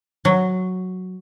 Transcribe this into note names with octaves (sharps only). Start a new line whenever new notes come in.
F#3